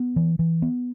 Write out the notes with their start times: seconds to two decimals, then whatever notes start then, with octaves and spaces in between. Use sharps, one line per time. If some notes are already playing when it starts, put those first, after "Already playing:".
Already playing: B3
0.16 E3
0.39 E3
0.62 B3